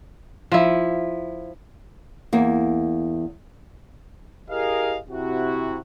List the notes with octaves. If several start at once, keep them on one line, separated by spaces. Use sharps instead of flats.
F3 E4
E2 A#3
E4 G4 G#4 A#4 D#5 F5
C3 E4 F#4